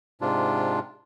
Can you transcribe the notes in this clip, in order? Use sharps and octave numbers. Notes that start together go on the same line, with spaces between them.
G#2 C3 D4 F4